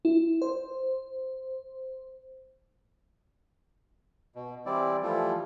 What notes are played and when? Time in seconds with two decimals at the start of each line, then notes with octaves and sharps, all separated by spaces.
0.05 E4
0.42 C5
4.35 B2
4.66 E3 G3 C4 E4 D5
5.03 E3 F3 G3 A3 E4 F4